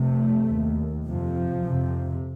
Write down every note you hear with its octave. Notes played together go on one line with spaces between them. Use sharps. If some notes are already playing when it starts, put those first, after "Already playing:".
Already playing: F2 C3 A3
D#2
F2 C3 F3
F2 C3